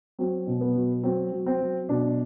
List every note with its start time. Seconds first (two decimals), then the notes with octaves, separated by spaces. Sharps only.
0.19 F#3 C4
0.47 B2
0.61 B3
0.76 F#3
1.03 F#3 C4
1.32 F#3
1.46 C4
1.61 F#3
1.89 B2 D4